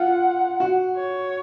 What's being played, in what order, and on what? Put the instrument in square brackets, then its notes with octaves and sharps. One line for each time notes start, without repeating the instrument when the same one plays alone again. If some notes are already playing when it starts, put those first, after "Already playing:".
Already playing: [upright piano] F4 [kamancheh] F#5
[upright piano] F#4
[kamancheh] C#5